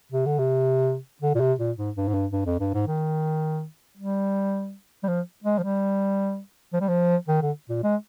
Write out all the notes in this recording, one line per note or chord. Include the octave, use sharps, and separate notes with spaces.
C3
D3
C3
D3
A#2
C3
A#2
G#2
G2
G#2
G2
G2
F2
G2
G#2
D#3
G3
G3
F3
G#3
F3
G3
F3
G3
F3
D#3
D3
A#2
G#3